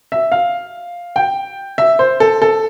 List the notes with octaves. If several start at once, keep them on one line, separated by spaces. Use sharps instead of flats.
E5
F5
G5
E5
C5
A4
A4